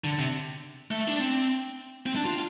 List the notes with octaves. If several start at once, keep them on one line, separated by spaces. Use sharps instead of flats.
D3
C3
A3
D4
C4
C4
D4
F4